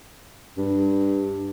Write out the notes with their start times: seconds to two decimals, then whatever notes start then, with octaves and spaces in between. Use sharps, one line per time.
0.57 G2